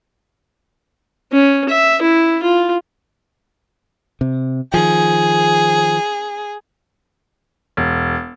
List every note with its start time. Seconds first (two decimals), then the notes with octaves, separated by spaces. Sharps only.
1.32 C#4
1.69 E5
2.02 E4
2.43 F4
4.21 C3
4.74 D#3 F3 G#4
7.77 E1